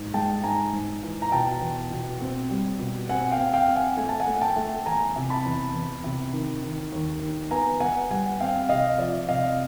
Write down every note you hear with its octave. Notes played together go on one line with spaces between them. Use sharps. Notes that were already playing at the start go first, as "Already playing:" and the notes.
Already playing: G#2
G#3 G5 A5
G#2 G#5 A#5
G#2
E3
A#5
B2 G5 A5
E2
B2
C4
G3
B2
C4 F#5 G#5
F5 G5
C4
F5 G5
C4
F#5 G#5
A3 G#5
A5
F#5 G#5
A3
G5 A5
A3
E2 G#5 A#5
C3
A5 B5
E2
E2
C3
D#3
D#3
D#2
D#3
B3 G#5 A#5
B3 F#5 G#5
G3 F#5 G#5
C4 F5 G5
C3 D#5 F5
F3 D5 E5
C3 D#5 F5